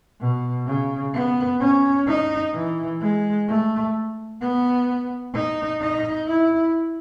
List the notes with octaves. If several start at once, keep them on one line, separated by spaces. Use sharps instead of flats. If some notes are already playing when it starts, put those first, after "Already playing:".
B2
C#3
B3
C#4
D#4
E3
G#3
A3
B3
D#4
D#4
E4